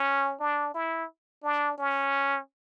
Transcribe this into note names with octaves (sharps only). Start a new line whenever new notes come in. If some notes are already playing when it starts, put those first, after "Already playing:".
Already playing: C#4
D4
E4
D4
C#4